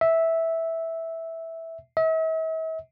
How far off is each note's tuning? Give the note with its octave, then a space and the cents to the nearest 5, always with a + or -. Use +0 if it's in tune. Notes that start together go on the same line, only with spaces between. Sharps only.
E5 -10
E5 -45